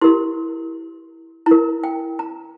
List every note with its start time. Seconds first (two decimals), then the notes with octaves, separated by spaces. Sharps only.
0.01 E4 G4 A#4 C6
1.46 E4 A#4 A#5
1.84 G5
2.19 A#5